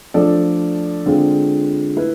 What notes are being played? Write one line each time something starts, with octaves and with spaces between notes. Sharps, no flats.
F3 A3 D4 A4 D5
D3 G#3 C4 F4
A3 E4 B4